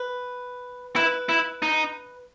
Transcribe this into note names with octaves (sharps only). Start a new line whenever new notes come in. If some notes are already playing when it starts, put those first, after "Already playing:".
Already playing: B4
E4 B4
E4
D#4